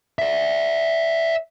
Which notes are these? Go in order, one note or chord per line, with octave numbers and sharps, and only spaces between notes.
D5 E5